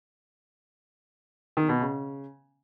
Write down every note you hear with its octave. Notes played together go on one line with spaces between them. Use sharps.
D#3
B2
C#3